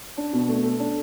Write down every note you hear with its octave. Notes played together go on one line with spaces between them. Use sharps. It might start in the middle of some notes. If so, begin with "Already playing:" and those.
D4
B2
A3
A4
D4